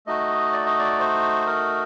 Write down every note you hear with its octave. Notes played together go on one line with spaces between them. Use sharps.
A3 D#4 F#4 D#5
D5
D#5
D5
C5
A#4